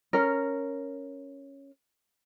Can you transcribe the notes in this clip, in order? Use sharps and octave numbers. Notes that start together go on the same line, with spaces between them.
C#4 A#4